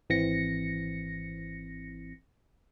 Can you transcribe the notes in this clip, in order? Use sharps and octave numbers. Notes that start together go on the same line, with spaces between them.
G#1 E3 C4 A#6 C#7